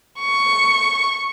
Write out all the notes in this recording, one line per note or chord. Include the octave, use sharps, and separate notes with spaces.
C#6